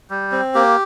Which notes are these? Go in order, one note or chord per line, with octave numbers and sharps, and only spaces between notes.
G3
C4
A#3 G4